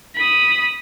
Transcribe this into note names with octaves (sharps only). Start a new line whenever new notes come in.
B5 D#6